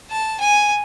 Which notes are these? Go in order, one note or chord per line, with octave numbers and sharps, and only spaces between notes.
A5
G#5